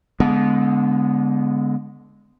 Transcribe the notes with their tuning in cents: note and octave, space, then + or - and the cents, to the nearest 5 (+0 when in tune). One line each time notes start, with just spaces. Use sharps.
D3 -30 G#3 +0 B3 +0